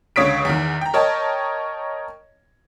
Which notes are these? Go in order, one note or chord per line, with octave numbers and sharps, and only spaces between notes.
C#2 D3 C#5 D#6 B6 D7
E2 D#3
G5 A#5
A#4 C#5 D#5 G5 A5